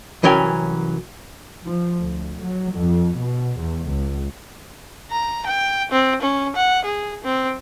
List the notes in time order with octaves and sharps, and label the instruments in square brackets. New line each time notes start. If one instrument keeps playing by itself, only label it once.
[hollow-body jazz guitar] C2 E3 F#3 C#4 A#4 G5
[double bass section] F3
D2
F#3
F2
B2
E2
C#2
[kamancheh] A#5
G5
C4
C#4
F#5
G#4
C4